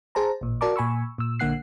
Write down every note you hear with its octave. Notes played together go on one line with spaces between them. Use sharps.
G#4 C5 A5 A#5
A1 A#2
F#4 A#4 D5 A5 A#5 D6
A#2 G#5 B5 C#6 E6
A#2 E6
A#1 D3 A#3 F#5 F#6 C7